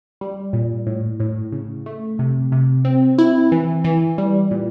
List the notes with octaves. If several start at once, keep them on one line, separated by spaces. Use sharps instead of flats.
G3
A#2
A2
A2
C#3
A3
C3
C3
C4
E4
E3
E3
G3
A#2